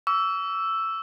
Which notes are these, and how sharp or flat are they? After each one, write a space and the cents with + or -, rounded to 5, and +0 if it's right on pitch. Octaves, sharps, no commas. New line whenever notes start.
C#6 +45 E6 +5